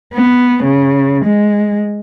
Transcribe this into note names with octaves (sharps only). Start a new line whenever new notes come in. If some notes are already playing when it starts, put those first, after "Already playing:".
B3
C#3
G#3